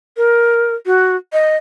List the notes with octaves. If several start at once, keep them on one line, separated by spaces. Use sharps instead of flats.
A#4
F#4
D#5